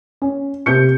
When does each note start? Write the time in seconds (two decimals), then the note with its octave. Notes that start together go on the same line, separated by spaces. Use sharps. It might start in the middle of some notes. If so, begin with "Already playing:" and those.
0.22 C#4
0.66 C3 G6 C#7